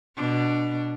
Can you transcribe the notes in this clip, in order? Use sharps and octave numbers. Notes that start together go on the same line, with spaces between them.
B2 D4